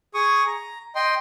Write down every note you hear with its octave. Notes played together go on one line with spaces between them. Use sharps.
G#4 C#6 D#6
A#5
D#5 G5 C6